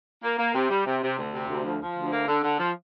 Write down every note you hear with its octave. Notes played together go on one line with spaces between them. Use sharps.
A#3
A#3
C3
G3
C3
C3
D2
C3
D2
F3
F3
D2
A#3
D3
D3
F3